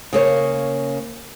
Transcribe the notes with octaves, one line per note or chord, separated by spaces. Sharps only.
C#3 A#3 C#5